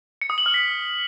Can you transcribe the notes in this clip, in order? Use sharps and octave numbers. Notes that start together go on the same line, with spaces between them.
C#7
D#6
F#7
F6
B6